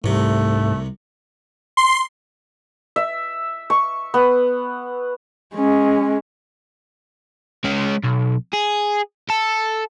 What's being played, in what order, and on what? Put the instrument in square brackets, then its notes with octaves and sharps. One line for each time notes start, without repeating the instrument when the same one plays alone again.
[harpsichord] C2 C3 [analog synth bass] G#2 [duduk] A3
[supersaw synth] C6
[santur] E5
C#6
B3
[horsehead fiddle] G#3 C#4
[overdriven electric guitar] G#3 C#4
B1
G#4
A4 A5